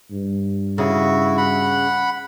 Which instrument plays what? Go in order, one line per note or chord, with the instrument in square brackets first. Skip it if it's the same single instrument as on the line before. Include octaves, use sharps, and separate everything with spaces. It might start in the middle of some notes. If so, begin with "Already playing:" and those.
[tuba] G2
[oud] C#3 [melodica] E4 F#4
[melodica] F#5 B5